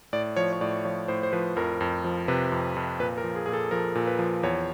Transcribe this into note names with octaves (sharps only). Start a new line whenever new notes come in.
A2 D5
F3 C#5
C#5
A2 D5
F3 C#5
A2 C5
C5
F3 B4
F2 A#4
F2
F3
C3 B4
F2
F2
A#2 B4
A#4
F3
G#4
A#2 G#4
A4
F3 A#4
A#2
B4
F3
E2 C#5